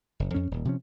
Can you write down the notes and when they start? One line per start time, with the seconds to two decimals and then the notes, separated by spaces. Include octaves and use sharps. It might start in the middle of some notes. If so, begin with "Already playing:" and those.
0.20 F#1
0.34 F2 C#4
0.51 D#1
0.65 C3 F3 C#4